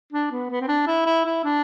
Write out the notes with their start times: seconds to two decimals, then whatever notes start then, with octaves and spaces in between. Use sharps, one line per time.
0.13 D4
0.32 B3
0.51 B3
0.61 C4
0.68 D4
0.87 E4
1.06 E4
1.26 E4
1.44 D4